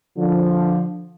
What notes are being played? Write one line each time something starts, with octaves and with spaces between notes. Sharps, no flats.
D3 F3